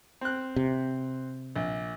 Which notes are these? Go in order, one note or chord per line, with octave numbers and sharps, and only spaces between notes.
C4 F#6
C3
A#1